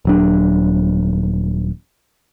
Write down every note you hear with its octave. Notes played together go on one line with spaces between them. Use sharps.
D#1 F#3 D4